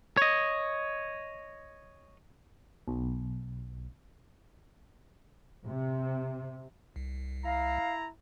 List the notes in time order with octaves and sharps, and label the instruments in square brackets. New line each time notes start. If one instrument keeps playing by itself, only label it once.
[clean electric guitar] C#5 D#5
[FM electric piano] B1
[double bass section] C3
[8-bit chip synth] C2
[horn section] E4 A#5 [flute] F5